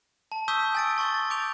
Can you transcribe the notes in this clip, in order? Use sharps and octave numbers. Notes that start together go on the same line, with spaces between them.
A5
C#6 D#6 E6 G6 B6 D#7
G#5 A6 D7
G#5 C6 C#6 A6 G7
A6
C#6 D6 G6 D7 F7